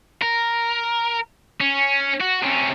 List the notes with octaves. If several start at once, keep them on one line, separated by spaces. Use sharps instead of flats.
A#4
C#4
F#4
C3 C#4